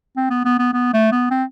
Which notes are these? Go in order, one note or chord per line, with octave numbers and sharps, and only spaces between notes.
C4
B3
B3
B3
B3
A3
B3
C4